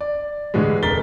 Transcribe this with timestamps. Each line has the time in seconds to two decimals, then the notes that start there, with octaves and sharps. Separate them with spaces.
0.01 D5
0.54 A2 D3 E3 G3 G#3
0.83 F1 A#4 A6 B6 G7